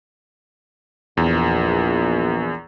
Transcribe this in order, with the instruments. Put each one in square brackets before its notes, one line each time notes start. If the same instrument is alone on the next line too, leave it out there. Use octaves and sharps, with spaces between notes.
[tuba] A#1 [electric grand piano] E2